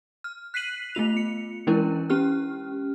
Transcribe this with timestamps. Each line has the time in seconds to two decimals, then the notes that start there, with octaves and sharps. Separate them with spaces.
0.24 F6
0.54 F#6 B6 C7 D#7 F#7
0.95 A3 B3 F4 F7
1.17 C#7
1.67 E3 G#3 C#4 D4 E4 A#4
2.10 C#4 G4 F6